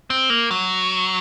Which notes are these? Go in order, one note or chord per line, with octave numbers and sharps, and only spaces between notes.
C4
A#3
F#3